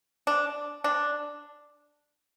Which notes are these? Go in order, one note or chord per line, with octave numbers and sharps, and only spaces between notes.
D4
D4